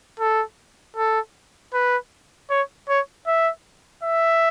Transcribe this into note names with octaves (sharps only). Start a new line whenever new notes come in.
A4
A4
B4
C#5
C#5
E5
E5